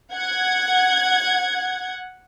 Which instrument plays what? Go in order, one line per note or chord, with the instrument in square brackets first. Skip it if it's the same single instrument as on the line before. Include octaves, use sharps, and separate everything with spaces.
[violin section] F#5 G#6